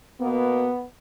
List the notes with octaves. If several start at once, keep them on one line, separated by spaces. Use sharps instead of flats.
B2 A#3 B3